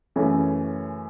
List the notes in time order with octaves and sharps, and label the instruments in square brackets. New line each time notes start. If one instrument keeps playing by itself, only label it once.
[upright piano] F#2 C#3 E3 A3 C#4